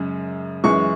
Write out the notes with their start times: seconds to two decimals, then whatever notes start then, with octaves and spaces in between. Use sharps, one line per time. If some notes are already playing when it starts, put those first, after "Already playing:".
Already playing: F#2 C#3 G#3
0.64 F#2 E3 G#3 C#6